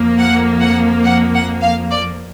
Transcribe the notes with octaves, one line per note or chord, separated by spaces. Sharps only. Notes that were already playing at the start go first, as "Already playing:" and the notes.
Already playing: F2 F3 A#3
F#5
F#5
F#5
F#5
F5
D5